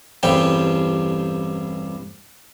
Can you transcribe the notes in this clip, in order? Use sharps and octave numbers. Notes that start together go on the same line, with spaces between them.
A1 E2 G2 C3 G3 G5